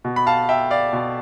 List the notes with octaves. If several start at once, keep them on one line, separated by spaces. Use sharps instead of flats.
B2
B5
F5 A5
E5 G5
D5 F5
B2